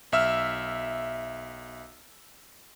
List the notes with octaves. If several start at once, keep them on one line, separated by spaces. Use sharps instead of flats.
B1 E5 E6 F6